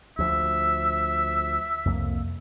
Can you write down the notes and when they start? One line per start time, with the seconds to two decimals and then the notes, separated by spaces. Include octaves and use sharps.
0.19 D2 F3 E5
1.85 C2 F2 A#3